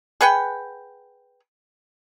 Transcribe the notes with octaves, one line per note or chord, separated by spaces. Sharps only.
G#4 B4 F#5 G5